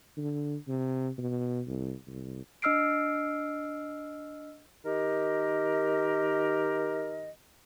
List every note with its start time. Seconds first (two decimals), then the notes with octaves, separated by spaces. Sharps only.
0.17 D3
0.68 C3
1.18 B2
1.67 C2
2.07 C2
2.62 D4 D#5 E6 F6 C7 D7
4.86 D#3 G4 A#4 D#5